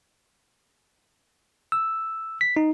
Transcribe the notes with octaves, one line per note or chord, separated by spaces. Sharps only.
E6
B6
D#4